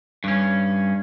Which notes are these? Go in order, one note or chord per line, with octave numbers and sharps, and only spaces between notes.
G2 C#4